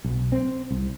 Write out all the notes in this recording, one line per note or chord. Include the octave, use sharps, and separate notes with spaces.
B1
C4
C2